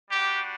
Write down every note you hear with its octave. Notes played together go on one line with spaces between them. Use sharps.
G3 D4 F#4 G4